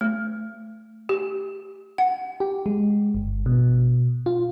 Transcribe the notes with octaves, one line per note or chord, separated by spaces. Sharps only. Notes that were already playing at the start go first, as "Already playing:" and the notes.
A3
G4
F#5
G4
G#3
G1
B2
F4